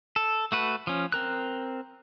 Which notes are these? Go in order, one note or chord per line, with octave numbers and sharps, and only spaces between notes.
A4
A3 F#4 B4
F3 C#4
C4 A#4 F#6